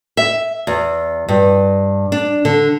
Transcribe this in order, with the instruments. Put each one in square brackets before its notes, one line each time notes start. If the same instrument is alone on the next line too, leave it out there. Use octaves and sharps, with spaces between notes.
[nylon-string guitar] E5
E2
G2
D4
D3